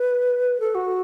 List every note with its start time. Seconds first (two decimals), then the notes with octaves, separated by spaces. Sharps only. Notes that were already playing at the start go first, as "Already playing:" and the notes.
Already playing: B4
0.60 A4
0.75 F#4